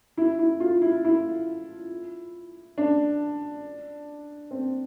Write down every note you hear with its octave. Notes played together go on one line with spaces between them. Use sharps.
E4
E4
F4
E4
E4
D4
C4